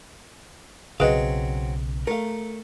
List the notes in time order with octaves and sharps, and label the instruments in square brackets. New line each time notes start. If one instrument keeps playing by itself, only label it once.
[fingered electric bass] B1 C#3 [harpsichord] F#3 C4 [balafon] G#4 B4 [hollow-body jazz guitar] D#5 F5
[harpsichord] A3 [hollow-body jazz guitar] A#4 F5